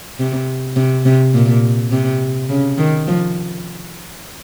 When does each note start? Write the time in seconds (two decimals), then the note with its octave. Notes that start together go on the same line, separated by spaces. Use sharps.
0.19 C3
0.76 C3
1.05 C3
1.34 A#2
1.92 C3
2.49 C#3
2.78 D#3
3.07 F3